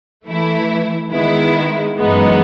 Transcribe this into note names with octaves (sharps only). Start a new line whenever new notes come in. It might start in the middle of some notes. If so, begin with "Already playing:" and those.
E3 A3 E4
D#3 G#3 B3 E4
F#2 E3 G#3 B3 D#4